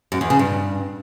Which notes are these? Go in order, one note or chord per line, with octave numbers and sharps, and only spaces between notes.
F#2
E2
C#3
G2